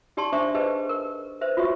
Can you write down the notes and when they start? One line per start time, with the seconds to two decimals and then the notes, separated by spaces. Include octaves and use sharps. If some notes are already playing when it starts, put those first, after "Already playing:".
0.17 D#4 G4 D5 A5 C6
0.32 D4 C5 E5 C#6 D6
0.54 G4 G#4 B4 C5 D#5 A5
0.89 A#4
1.41 B4 C5 E5
1.57 F4 F#4 C#5 E5 C#6